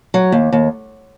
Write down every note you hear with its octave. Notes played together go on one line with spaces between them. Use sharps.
F#3
D#2
D#2